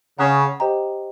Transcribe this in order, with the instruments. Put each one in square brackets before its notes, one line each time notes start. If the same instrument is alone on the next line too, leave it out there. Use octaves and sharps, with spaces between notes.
[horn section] C#3 [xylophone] F#5 A#5 D#6 F#6
[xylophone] G4 C5 D#5 G5 A#5